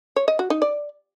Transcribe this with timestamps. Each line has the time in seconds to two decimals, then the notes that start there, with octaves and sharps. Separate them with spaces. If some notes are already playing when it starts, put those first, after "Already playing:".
0.16 C#5
0.28 D#5
0.39 F#4
0.50 D#4
0.62 D5